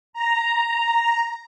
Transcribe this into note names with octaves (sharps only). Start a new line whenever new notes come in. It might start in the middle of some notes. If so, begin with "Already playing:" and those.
A#5